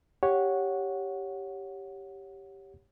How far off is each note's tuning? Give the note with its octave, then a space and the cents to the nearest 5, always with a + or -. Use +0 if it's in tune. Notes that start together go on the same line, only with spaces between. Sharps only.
G4 +0 C#5 +0 F#5 -10